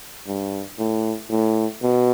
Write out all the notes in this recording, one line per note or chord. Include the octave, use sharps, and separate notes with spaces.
G2
A2
A2
B2